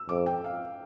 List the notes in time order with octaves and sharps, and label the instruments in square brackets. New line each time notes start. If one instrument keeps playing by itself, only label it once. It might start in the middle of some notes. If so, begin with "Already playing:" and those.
Already playing: [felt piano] E6
[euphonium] F2 [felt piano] D6
[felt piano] G5
F5